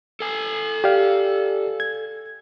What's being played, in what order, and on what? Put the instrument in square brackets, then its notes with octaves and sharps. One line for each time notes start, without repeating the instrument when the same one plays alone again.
[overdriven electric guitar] A4 G#5
[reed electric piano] G4 D5 F5
G#6